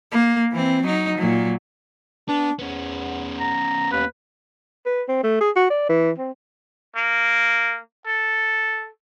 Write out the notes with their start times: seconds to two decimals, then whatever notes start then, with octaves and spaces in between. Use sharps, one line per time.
0.12 A#3
0.51 E3 C4
0.82 F#3 D#4
1.17 A#2 F#3
2.29 B3 D4
2.59 E2 B3 C#4
3.40 A#5
3.92 D#2 B4
4.86 B4
5.08 C4
5.23 A3
5.41 G#4
5.56 F#4
5.70 D5
5.89 E3
6.18 C4
6.96 A#3
8.07 A4